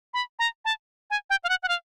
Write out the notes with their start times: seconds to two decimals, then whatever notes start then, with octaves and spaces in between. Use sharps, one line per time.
0.14 B5
0.39 A#5
0.65 A5
1.10 G#5
1.30 G5
1.44 F5
1.49 F#5
1.63 F#5
1.68 F5